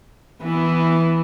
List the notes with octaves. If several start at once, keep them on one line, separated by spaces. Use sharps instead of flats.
E3 B3 E4